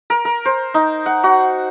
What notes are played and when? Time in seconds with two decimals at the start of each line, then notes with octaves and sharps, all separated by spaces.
0.10 A#4
0.25 A#4
0.46 C5
0.74 D#4
1.06 F#5
1.24 F#4